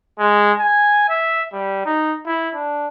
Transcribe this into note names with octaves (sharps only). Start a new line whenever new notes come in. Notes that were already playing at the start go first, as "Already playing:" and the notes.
G#3
G#5
E5
G3
D#4
E4
D4